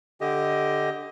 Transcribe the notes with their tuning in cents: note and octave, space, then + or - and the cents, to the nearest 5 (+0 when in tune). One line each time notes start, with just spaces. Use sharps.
D3 +0 G4 +0 D#5 +15